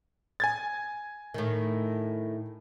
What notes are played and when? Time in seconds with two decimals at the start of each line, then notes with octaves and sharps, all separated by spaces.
0.40 G#5 G#6 A6
1.34 A2 D#3